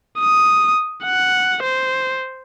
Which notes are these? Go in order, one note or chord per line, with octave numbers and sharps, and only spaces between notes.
D#6
F#5
C5